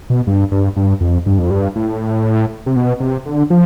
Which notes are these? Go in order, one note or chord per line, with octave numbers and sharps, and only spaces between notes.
B2
G2
G2
G2
F2
G2
F2
G2
A2
C3
B2
C3
D3
F3